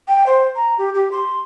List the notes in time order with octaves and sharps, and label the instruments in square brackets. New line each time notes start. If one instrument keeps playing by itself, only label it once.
[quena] G5
C5
A#5
G4
G4
C6